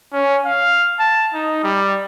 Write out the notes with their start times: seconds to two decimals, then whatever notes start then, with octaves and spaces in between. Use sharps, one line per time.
0.13 C#4
0.46 F5
0.99 A5
1.34 D#4
1.64 G3